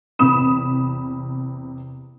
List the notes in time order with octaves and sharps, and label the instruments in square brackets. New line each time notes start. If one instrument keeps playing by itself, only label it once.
[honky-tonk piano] E2 C3 B5 D#6 E7